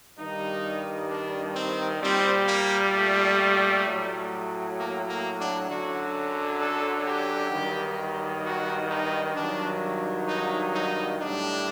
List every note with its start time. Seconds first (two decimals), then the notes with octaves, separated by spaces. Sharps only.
0.18 G2 D#3 G3 D#4
1.09 D4
1.55 C4
2.01 A#2 G3 C4
2.47 A#3
2.93 A3
3.85 A2 F#3
4.77 A#3
5.07 A#3
5.38 D4
5.69 F#2 D3 F#3 F#4
6.61 A4
7.07 G4
7.52 G2 D#3 F#3
8.44 F#4
8.90 D#4
9.36 G2 D#3 F#3 D4
10.28 D#4
10.74 D#4
11.20 A2 G3 D4